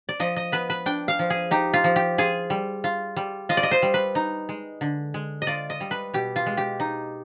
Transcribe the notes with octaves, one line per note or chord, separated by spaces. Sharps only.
D5
F3 D#5
D#5
B3 B4
B4
D4 G5
F5
F3
G#4
D#4 G4
F4
F3
G4
F4 G#4
G3
F4
G3
F4 D#5
D5
D#5
C5
G3
B4
D#4
G#3
D3
G#3
D#5
F4 D5
D#5
G3
B4
B2 G4
F4
G#3
G4
D#4